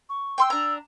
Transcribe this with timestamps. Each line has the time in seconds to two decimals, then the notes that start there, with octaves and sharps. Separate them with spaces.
0.09 C#6
0.38 G5 C6 E6
0.50 D4 A#5 E6